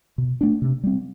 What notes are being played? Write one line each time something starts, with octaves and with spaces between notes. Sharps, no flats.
B2
A3 D4
C3
G3 C4